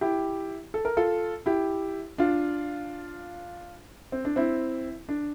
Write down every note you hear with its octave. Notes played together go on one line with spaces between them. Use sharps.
E4 G4
A4
A#4
F4 A4
E4 G4
D4 F4
C4
D4
C4 E4
D4